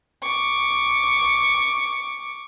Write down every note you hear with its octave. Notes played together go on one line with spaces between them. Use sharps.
C#6 D6